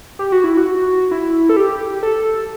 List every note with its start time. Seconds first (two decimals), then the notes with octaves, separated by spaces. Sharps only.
0.19 G4
0.32 F#4
0.44 E4
0.57 F#4
1.11 E4
1.49 A4
1.56 G4
2.03 A4